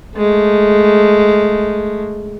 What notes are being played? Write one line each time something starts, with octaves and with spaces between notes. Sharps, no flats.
G#3 A3